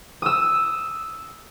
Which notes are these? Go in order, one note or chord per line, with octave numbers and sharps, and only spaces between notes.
D#6 E6